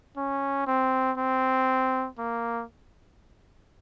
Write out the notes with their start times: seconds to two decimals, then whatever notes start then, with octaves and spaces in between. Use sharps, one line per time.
0.17 C#4
0.67 C4
1.17 C4
2.18 A#3